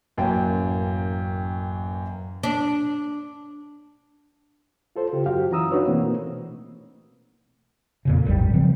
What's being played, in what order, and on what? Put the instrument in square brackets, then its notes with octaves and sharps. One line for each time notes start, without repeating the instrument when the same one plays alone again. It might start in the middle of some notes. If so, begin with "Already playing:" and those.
[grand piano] A1 F#2 A#3 C#5 G5
[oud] D4
[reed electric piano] F4 A4 C5
C#3 F4 G4
F#2 F#4 G4 F5
E3 C#4 A#5 D#6 E6
D4 D#4 F#4 B4 C#5
B2 E3 A3 A#3 C4
[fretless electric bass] F2 A#2 C#3
E1 A1 G#2 G3
C#3 F3 C4